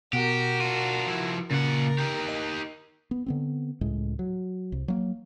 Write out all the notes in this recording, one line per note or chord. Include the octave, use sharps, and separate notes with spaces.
B2 F#4 G4 A#4
D4 F4
F3 E4
A#2 C#3 A#4 F#5 A6
D#4 G4
D#5
B3
D3 B3 C4
C#2 A2 G#3
F#3
C2
F#3 A#3